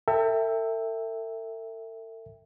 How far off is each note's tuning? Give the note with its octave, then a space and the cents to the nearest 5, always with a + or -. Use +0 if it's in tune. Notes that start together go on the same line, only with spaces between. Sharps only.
A4 +45 E5 +0 G5 +20